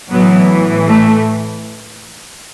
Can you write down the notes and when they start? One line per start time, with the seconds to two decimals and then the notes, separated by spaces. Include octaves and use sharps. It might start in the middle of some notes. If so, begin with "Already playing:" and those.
0.11 A2 E3 F#3 B3
0.87 A3